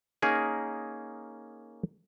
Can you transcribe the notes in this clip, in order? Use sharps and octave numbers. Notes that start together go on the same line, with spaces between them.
A#3 C#4 D#4 G#4 A#4